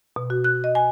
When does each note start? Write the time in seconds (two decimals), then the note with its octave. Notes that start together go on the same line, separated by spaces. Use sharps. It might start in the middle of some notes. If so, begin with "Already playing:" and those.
0.16 B2
0.30 F#4
0.44 F#6
0.64 D#5
0.75 G#5